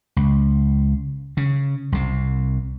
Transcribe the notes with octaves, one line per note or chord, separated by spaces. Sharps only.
C#2
C#3
C2 C3